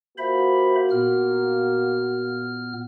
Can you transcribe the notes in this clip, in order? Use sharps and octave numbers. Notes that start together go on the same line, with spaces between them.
A#3 F4 F#4 C5 E5 B5
A#2 B3 F6